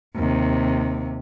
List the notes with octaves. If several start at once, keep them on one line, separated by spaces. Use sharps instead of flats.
D#2 C3